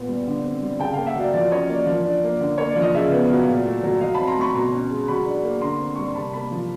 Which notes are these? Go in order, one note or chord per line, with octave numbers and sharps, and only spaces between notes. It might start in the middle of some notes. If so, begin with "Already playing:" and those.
Already playing: A#2 B3
G3
D3
C4
G3
C#3 G5 A5
A#3 F5 G5
E5 F#5
F#3 D5
F3 D5
C#4 C#5 D#5
A#3 D5
F3
D4
A#3
D3
A#3 C#5
D5
F3
D#5
C#3 D5 E5
B3
F#3
A#2
A3
F#3
F#3 D#5 F5
C4 A5 B5
A#5 C6
A3 B5 C#6
B2 A#5 C6
C#4
G#3
F#3 B5 C#6
D4
A#3
D3 A#5 C6
C4
G3 C#6
C6
C3 A5 B5
A#3 A5 B5
F3